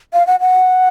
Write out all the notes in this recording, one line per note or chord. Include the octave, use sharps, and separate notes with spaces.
F5
F#5
F#5